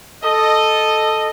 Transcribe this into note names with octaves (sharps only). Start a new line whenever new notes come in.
A4 D#5